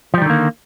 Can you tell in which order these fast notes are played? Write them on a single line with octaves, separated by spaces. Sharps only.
F3 G3 D#3 D3 A#3